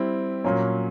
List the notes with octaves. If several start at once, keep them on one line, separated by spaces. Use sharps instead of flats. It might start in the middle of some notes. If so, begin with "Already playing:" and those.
Already playing: G3 C4 E4
A#2 F#3 A#3 C#4